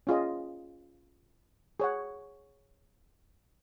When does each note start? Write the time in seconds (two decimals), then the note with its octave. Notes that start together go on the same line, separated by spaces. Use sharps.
0.07 C#4 F4 G#4 D#5
1.80 G#4 C#5 F#5